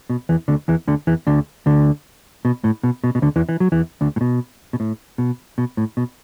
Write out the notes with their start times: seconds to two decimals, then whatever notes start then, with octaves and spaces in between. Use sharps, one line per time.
0.10 B2
0.29 E2 E3
0.48 D2 D3
0.68 E2 E3
0.87 D2 D3
1.07 E2 E3
1.27 D2 D3
1.66 D2 D3
2.45 B2
2.64 A2
2.83 B2
3.04 B2
3.15 B2
3.22 D2 D3
3.36 E2 E3
3.49 E3
3.60 F#3
3.72 E2 E3
4.01 D2 D3
4.16 A2
4.21 B2
4.73 B2
4.80 A2
5.18 B2
5.58 B2
5.77 A2
5.97 B2